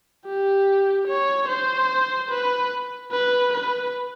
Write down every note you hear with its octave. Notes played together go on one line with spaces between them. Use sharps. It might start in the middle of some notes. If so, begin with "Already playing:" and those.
G4
C#5
C5
B4
B4
B4